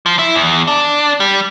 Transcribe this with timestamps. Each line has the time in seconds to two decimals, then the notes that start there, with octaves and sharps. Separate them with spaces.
0.06 F3
0.19 E4
0.35 E2
0.67 D4
1.20 G3